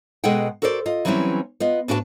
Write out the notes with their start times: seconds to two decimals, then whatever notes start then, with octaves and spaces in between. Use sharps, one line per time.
0.24 B2 G#3 G#4 A4 F#5 G5
0.62 F#4 A4 A#4 C5 D5
0.86 F4 D#5
1.05 E3 F#3 G3 C4 C#4 E4
1.60 B3 F4 D#5
1.88 A2 D4 F#4 B4 G5 A5